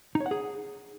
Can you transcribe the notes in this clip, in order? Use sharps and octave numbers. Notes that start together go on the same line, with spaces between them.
D#4
C#5
F#5
G#4